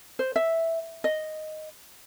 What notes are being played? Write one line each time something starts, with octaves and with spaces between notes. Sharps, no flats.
C5
E5
D#5